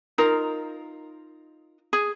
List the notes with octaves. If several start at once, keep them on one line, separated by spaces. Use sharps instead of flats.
D#4 F4 A#4
G#4